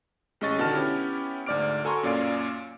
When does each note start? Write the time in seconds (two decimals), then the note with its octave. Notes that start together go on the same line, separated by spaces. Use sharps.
0.41 A1 G#3 C#4 D#5 C#6 A6
0.58 B2 D3 D#3 F#4 A5 F6
0.74 B3 C#4 E4 G4
1.46 D2 G#2 D5 D6 F6 D7
1.84 F#4 A4 G#5 A#5 C6 C#6
2.03 F#2 A#2 C#4 D5 F5 D7